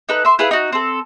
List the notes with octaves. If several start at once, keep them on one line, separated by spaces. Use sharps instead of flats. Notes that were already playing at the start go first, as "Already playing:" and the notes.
D#4 A4 B4
E5 C6
E4 G#4 B4 F5
D#4 F#4
C4 A4